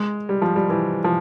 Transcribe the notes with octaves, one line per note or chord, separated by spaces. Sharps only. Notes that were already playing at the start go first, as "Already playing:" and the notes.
Already playing: G#3
G3
F3
G3
E3
F3